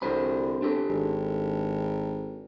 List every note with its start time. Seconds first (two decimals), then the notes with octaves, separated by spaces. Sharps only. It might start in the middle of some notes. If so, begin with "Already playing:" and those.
0.02 C2 D3 C5 B5
0.62 D4 G4 A4
0.89 G#1